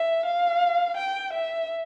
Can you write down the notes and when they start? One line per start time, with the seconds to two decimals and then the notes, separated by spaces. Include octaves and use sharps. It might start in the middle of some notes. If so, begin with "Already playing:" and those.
Already playing: E5
0.26 F5
0.97 G5
1.33 E5